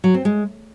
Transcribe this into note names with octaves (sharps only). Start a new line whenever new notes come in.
F#3
C4
G#3